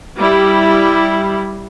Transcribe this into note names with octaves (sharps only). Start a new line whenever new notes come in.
G3 E4